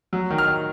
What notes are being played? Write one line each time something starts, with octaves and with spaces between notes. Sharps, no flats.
F#3
D#3
F6
D#3